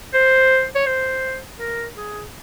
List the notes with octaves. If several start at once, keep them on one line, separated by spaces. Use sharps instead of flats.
C5
C#5
C5
A#4
G#4